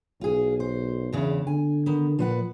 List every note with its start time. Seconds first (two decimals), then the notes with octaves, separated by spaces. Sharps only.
0.21 B1 F4 G#4
0.60 C5
1.13 E2 C#3 D4
1.47 D3 G#5
1.86 D#3 B3
2.19 A#2 F3 B4 F#5